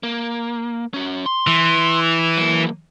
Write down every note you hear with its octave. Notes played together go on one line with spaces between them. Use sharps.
A#3
C#4 F#4
C6
E3
F#3 A#3